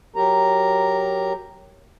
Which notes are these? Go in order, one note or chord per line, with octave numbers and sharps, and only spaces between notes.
F#3 G4 A#4 A#5